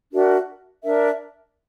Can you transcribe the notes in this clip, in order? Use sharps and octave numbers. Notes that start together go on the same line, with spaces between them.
D4 F#4 A#4 E5
D4 A#4 E5